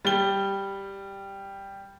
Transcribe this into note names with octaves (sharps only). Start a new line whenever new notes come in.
G3 G7